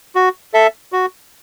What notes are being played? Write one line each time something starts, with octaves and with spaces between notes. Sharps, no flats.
F#4
A4 E5
F#4